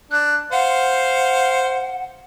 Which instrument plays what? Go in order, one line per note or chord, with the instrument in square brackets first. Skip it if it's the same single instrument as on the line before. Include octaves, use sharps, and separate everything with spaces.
[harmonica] D4 [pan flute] F#6
[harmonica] C5 F5 [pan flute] F#5